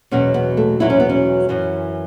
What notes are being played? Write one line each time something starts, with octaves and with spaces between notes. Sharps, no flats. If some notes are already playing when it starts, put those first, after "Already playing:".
E2 B2 F#3 C#4
B3
A3
E2 B2 F#3 E4
C#4
B3
C#4
F#2 E3